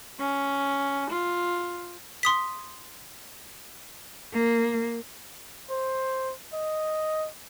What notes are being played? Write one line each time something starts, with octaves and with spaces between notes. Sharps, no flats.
C#4
F4
C6 D#6 B6
A#3
C5
D#5